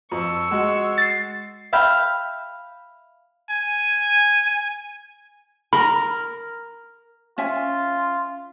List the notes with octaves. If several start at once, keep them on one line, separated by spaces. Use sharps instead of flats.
F2 C#6 E6
G#3 F#4
A6 C7
E5 F5 G5 B5
G#5
A#4 B5
C#4 F4 E5 G#5